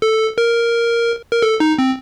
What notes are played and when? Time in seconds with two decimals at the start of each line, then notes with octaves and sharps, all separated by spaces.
0.02 A4
0.38 A#4
1.32 A#4
1.42 A4
1.60 D#4
1.79 C4